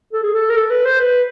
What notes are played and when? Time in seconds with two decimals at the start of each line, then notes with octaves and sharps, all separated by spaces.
0.13 A4
0.23 G#4
0.34 A4
0.50 A#4
0.56 A4
0.70 B4
0.85 C5
0.99 B4